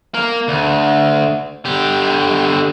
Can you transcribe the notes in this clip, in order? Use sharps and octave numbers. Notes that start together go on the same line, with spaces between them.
A#3
D2
D3 G4